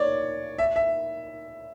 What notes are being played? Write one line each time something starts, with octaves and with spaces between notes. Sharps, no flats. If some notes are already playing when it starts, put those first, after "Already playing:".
Already playing: C#5 D5
E5
E5